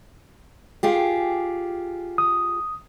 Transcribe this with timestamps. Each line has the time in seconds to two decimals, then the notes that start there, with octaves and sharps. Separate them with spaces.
0.83 F4 G4 G#4
2.18 D#6